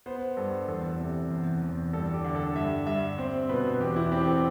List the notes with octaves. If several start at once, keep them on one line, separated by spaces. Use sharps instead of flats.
B3 C5
G2 A4
E2 A4
C3
E2
E2
G2 A4
G4
D3
A4
G2 E5
G2 E5
C4 C5
B2 B4
E2 G4
E4
C4 G4
A4